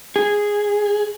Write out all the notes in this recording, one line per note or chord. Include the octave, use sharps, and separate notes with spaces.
G#4